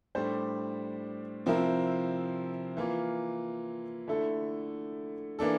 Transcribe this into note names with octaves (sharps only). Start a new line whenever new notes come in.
A2 G3 D4 G4 C5
C3 F3 C4 E4 A#4
E3 A#3 F4
D3 A3 E4 A4
E3 A#3 D4 A4